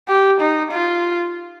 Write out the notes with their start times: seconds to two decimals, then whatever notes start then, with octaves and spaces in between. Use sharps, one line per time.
0.08 G4
0.40 D#4
0.71 F4